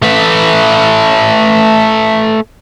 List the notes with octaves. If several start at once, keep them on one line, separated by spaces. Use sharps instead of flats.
A3 B4